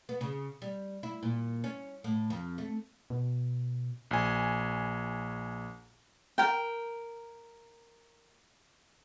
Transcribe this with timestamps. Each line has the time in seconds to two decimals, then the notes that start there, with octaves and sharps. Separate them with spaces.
0.09 B3
0.21 C#3
0.62 G3
1.03 E4
1.23 A#2
1.64 C#4
2.04 A2
2.30 F2
2.58 A3
3.10 B2
4.11 A#1 G#5
6.38 A#4 G5